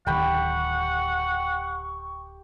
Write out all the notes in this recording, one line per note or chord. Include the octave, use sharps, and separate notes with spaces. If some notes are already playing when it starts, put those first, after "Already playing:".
D1 D#3 G4 F#5 G5 B5 C#6